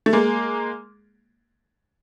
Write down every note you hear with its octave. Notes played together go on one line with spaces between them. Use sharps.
A3
G#3 A#3